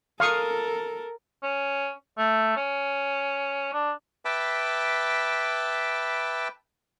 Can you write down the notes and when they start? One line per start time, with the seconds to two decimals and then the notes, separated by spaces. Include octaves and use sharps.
0.20 A4 A#4 F5 C#6 D#6
1.43 C#4
2.18 A3
2.56 C#4
3.73 D4
4.25 B4 E5 G5 A5 B5 D6